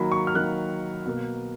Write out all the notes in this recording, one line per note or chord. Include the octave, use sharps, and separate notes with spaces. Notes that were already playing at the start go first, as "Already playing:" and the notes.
Already playing: D#3 F#3 A#3 B5
C#6
F6
D#3 F#3 A#3 F#6
B2 A#3